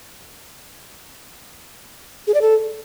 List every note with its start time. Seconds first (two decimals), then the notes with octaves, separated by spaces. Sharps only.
2.27 G#4
2.34 D5
2.41 A4